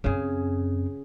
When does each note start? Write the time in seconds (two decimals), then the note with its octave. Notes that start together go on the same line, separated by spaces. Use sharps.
0.04 F#2 C#3 C4 G#4